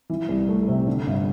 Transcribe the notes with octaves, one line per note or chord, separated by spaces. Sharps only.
E3
C2
A3
C3
D3
G1